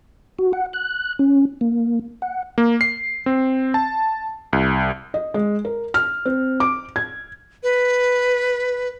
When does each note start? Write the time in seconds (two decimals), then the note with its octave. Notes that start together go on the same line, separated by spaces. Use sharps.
0.39 F#4
0.53 F#5
0.73 F#6
1.19 C#4
1.61 A#3
2.22 F#5
2.58 A#3
2.81 C7
3.26 C4
3.74 A5
4.53 C2
5.14 D#5
5.34 G#3
5.65 A#4
5.94 F6
6.25 C4
6.60 D6
6.96 G#6
7.63 B4